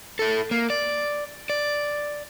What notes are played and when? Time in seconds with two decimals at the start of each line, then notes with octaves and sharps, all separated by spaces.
0.19 E4 A4
0.51 A#3
0.70 D5
1.50 D5